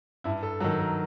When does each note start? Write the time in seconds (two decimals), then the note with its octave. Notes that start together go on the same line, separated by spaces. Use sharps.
0.24 G2 E4
0.43 A4
0.60 F#3 A4
0.64 D#3
0.80 A#4